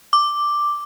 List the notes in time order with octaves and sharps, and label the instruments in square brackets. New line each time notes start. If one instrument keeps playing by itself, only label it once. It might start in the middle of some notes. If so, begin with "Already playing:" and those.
[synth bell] D6